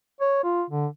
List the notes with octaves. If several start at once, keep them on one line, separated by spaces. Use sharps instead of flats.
C#5
F4
D3